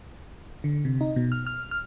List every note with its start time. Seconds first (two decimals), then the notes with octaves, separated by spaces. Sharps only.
0.64 D3
0.85 C3
1.01 D#4
1.16 B2
1.32 F6
1.47 F6
1.71 F6